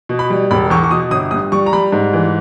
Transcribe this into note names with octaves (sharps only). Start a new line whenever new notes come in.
B2
B5
G3
E1 B5
E2 C#6
C#6
B2 D#6
G1 D#6
G2 D#6
G3 C#6
A#5
G3 B5
G#2
E3